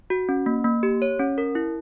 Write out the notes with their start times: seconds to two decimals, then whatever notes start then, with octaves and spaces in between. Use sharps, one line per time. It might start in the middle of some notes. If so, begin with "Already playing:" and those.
0.10 F#4
0.29 C#4
0.46 A#3
0.64 A#3
0.83 G4
1.02 C#5
1.20 C#4
1.38 A#4
1.55 E4